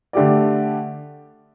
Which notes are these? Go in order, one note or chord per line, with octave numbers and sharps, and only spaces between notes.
D3 A3 G4 D5